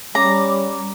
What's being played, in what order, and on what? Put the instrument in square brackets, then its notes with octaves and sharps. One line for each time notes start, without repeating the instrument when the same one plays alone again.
[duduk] G3 [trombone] C#4 [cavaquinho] A#5 [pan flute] D6